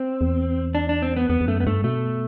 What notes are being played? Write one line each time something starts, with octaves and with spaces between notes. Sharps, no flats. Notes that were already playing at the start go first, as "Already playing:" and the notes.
Already playing: C4
E2
D4
D4
C4
B3
E2 B3
E2
F#2 A3
B3
G2 A3
B2 A3